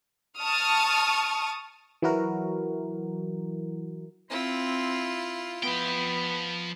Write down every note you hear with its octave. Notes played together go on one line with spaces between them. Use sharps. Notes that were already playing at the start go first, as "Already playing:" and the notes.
A5 C#6 D#6 F6
E3 F#3 E4 F#4 A#4
C4 E4 F4
F3 B3 G5